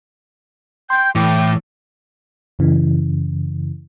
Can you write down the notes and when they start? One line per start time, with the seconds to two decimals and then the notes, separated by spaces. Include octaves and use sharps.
0.90 G5 C6 G6
1.15 A2 E3 G5 D6
2.59 F#2 C#3 E3